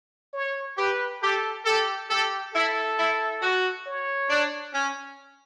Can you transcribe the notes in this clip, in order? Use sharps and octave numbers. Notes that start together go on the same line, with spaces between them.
C#5
G4 B4
G4 A4
G4 A4
G4 A4
E4 A4
E4
F#4
C#5
D4
C#4